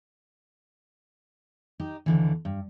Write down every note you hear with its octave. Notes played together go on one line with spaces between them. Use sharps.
D#4 G4
D#2 D3 E3
G2